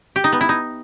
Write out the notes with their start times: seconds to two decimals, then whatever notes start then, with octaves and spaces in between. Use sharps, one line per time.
0.16 G4
0.24 D#4
0.32 B3
0.41 E4
0.49 D#4